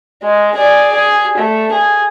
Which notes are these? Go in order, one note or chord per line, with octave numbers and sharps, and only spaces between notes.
G#3
G#4 D5
G#4
A3
G#4